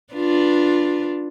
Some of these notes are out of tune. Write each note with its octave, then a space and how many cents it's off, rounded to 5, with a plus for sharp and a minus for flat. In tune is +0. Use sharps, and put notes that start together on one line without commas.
D4 +0 F4 +0 B4 -15